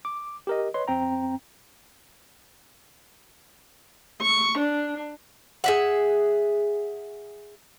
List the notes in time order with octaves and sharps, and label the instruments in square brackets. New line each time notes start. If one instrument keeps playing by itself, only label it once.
[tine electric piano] D6
G4 A#4 D#5
B4 C#5 D#5 C6
F2 C4 G5 A#5
[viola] C#6
D4
[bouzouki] G#4 E5 F#5